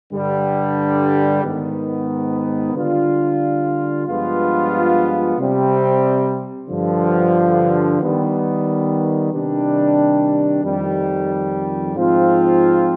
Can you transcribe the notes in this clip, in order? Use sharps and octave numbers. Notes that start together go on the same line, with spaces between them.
G2 D3 G3
G#2 D#3 B3
D3 G3 D4 F4
G2 F3 G#3 B3 F4
C3 G3 C4
G2 D3 F3
D#3 G3 B3
C3 D#3 G3 D4
F2 D#3 G3
G#2 F3 C4 F4